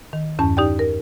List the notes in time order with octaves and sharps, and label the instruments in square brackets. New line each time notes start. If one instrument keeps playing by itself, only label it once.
[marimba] D#3
E2 G2 C#4 A5
D#4 G4 D5 G5
A#4